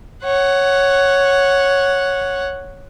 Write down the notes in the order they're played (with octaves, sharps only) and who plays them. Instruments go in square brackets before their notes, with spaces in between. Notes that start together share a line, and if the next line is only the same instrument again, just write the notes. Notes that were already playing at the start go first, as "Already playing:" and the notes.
[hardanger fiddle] C#5 F#5